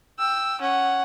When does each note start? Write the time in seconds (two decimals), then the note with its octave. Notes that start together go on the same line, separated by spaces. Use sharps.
0.19 G5 E6
0.61 C#4 F#5